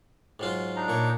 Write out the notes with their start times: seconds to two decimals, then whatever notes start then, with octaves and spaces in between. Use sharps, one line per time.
0.40 G#2 F#3 F4
0.76 D4 D#4 A#5
0.88 A#2 C#5